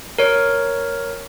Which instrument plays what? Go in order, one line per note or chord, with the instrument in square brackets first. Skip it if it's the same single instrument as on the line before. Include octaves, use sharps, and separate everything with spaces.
[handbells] A#4 C#5